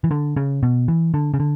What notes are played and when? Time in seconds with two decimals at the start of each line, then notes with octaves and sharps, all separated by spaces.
0.04 E3
0.11 D3
0.36 C#3
0.63 B2
0.88 E3
1.14 D3
1.34 C#3
1.40 D3